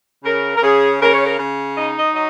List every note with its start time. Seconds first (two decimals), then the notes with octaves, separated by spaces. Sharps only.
0.24 C#3 A#4
0.56 A#4
0.63 C#3 G#4
1.01 C#3 A#4
1.13 C#5
1.25 A#4
1.39 C#3
1.76 D#4 D#5
1.96 D#5
2.14 F#3 D#5